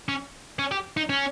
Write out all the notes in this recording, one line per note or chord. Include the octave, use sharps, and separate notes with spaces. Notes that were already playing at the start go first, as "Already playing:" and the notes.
C#4
C#4
G4
D#4
C#4